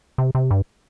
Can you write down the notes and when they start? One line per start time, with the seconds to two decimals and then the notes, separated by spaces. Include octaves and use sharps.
0.18 C3
0.35 C3
0.51 G2